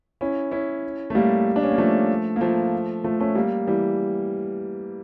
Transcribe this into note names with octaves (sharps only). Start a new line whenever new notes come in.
C#4 E4
C#4 E4
A3
G3 A#3
D4
C#4
A#3
F3 A3
A#3
F3 A3
F3 A3
A3 C#4
G3 A#3
E3 G3